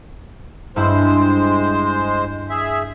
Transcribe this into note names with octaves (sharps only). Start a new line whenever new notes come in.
G2 G#3 E4 C5
G#4 E5